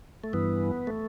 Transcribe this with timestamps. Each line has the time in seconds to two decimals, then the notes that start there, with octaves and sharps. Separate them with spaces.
0.24 A3
0.33 G2 E3 B3
0.87 A3